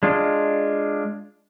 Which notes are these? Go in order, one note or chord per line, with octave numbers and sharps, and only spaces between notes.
G#3 D4 F4